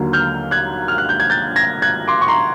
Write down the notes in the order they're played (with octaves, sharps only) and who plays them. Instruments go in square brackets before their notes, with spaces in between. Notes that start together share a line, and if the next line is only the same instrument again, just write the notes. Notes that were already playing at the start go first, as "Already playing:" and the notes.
Already playing: [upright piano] D#2 D3 F#3 A#3
F6 G6
F#6 G#6
F6
F#6
G6
G#6
G6 A6
G#6 A#6
F#6 G#6
C6 D6
C#6
A#5 C6